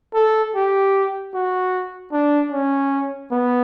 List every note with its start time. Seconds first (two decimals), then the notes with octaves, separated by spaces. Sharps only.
0.15 A4
0.55 G4
1.34 F#4
2.12 D4
2.52 C#4
3.31 B3